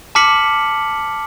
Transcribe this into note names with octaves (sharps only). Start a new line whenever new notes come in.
A5 D6 F6 B6 C#7 F#7